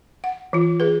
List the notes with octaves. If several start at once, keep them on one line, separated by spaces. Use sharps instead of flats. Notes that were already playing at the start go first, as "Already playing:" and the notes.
F#5
E3 F4
G#4 B4